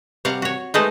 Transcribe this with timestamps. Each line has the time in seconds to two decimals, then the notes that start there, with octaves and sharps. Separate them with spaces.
0.25 C3 G3 F5 F#5
0.42 F#4 C#5
0.74 G#3 A3 D#4 B4 C5